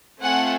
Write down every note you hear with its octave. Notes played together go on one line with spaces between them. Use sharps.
A3 C4 F4 A4 F#5 G#5